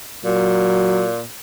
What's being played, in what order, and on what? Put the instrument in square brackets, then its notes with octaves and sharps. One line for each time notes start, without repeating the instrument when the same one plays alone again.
[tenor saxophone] A#2 [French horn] F#3